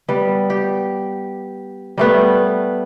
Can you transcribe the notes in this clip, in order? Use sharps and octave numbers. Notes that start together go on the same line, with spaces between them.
G3 B3
G4
G3 A3 B3